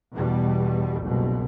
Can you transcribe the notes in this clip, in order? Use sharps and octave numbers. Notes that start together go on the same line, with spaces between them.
E2 B2 G3
F#1 C2 B2